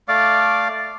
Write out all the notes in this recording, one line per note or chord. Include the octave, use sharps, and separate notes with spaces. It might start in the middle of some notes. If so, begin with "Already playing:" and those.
A3 D5 F5 D6